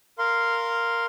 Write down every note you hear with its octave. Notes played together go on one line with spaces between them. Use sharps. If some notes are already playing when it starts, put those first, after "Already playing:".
A#4 F5 C6